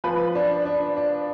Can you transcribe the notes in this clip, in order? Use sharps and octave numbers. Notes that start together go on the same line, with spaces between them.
F3 B4
D4
D4
D4